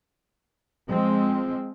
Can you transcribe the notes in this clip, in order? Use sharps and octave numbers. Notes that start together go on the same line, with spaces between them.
F3 G#3 C4